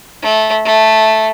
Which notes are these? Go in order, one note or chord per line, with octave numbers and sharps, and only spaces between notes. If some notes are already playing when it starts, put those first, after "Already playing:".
A3
A3